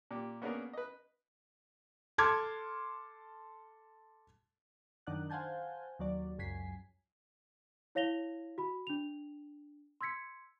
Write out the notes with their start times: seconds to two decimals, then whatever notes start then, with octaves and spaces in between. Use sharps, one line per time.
0.11 A#2 G4
0.42 A#3 B3 C#4 D4 G#4 A#4
0.73 B4 D#5
2.18 A4 A5 C6 D6 F6 G#6
5.07 F#2 D#3 D4 D5 F#5 F#6
5.30 C5 F5 F#5 G#5 A5 G6
5.99 D#2 F#3 D5
6.38 C#2 F#2 G#5 B6 C7
7.95 E4 C#5 F5 A#6 F7 G7
8.58 F#4 B5
8.87 D4 F7
10.01 C6 E6 G#6 B6 C#7